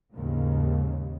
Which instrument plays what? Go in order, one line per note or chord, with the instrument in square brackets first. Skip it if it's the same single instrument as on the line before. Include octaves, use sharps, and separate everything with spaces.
[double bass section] D#2 G#2 C#3